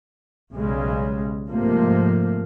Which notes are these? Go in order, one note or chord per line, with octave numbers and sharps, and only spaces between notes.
B1 C#3 G3 G#3
G#2 C3 F3 A3 A#3